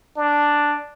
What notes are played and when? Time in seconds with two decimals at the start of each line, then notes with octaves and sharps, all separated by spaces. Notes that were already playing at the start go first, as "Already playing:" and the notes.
0.17 D4